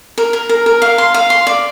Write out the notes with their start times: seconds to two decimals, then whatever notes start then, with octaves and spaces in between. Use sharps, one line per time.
0.18 A#4
0.33 A#4
0.49 A#4
0.66 A#4
0.82 F5
0.98 C6
1.14 F5
1.30 C6
1.47 D5